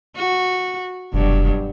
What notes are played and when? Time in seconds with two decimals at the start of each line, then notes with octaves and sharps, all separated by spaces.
0.16 F#4
1.14 F1 G2 B2 F#3